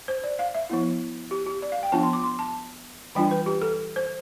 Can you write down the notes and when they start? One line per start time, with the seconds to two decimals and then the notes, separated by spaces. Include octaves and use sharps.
0.08 C5
0.24 D5
0.39 F5
0.55 E5
0.70 F3 B3 E4
1.31 G4
1.46 G4
1.62 D5
1.72 F5
1.83 G5
1.92 F3 B3 D4 F4 A5
2.03 C6
2.13 D6
2.23 C6
2.39 A5
3.15 E3 G3 D4 F4 G5
3.31 B4
3.46 G4
3.62 A4
3.96 C5